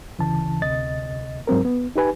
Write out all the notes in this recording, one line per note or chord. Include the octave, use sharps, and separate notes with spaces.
D2 C#3 E3 A5
D2 C3 D#5 A6
G#2 F#3 C4 A#4
B3
D#4 G4 B4 G#5